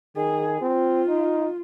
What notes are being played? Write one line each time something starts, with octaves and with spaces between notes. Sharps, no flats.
D#3 G#4
C4 F4
D#4